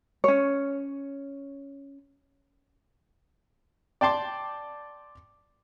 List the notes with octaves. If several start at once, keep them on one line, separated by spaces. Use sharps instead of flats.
C#4 C#5
D5 G5 A5 C6 D6